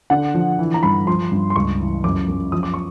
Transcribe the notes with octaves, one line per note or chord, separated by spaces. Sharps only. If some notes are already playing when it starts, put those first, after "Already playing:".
D3 F#5
F3
E3
A#5
G2 B5
F3 C6
G2
C6
C#2 C#6
E3
F#2 D6
F#2
F3 D#6
D6
C#6